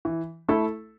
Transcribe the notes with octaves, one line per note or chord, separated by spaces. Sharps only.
E3
A3 E4 A4